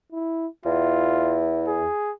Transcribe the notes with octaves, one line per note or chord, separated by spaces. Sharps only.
E4
E2 E4 F4
G#4